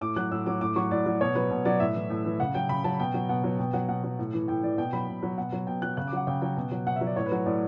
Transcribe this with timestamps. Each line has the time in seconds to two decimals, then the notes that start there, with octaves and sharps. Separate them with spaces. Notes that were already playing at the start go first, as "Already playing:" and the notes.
0.01 A2 D6
0.16 F#3 F#6
0.31 A2 E6
0.46 F#3 D6
0.61 A2 D6
0.76 F#3 C#6
0.91 A2 D5
1.06 F#3
1.21 B2 C#5
1.35 F#3 B4
1.50 B2 B4
1.65 F#3 D5
1.80 A2 E5
1.95 E3
2.10 A2
2.25 E3
2.40 C#3 F#5
2.54 F#3 G5
2.69 C#3 B5
2.84 F#3 A5
2.99 B2 G5
3.14 F#3
3.29 B2 F#5
3.44 F#3
3.59 B2 G5
3.73 F#3 F#5
3.88 B2 F#5
4.03 F#3
4.19 A2
4.33 E3
4.48 A2 G5
4.63 E3 D5
4.78 B2 G5
4.93 F#3 B5
5.08 B2
5.23 F#3
5.38 B2 F#5
5.52 F#3
5.67 B2 G5
5.82 F#3 F#6
5.97 C#3 F#6
6.07 D6
6.12 F#3 F#5
6.27 C#3 G5
6.42 F#3 G5
6.56 B2
6.72 F#3
6.86 B2 F#5
6.96 E5
7.01 F#3
7.06 D5
7.16 A2 C#5
7.26 B4
7.32 F#3
7.46 A2 D5